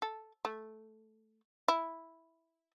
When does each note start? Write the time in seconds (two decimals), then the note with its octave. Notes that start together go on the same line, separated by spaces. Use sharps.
0.02 A4
0.45 A3
1.68 E4